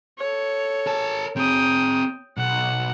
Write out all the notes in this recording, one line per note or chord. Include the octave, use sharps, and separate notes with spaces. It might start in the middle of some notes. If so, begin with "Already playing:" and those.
A4 C#5
A#4 A5
C4 G#4 G5 D#6
B1 F#5